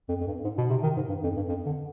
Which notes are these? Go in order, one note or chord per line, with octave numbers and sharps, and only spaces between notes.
F2
F2
G2
G#2
B2
C3
D#3
G#2
G2
F2
G2
F2
D3